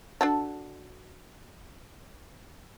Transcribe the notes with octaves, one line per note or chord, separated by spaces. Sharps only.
D4 F#4 A4